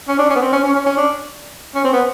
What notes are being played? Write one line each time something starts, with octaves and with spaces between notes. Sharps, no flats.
C#4
D4
C#4
B3
C4
C#4
C#4
C#4
C#4
D4
C#4
C4
B3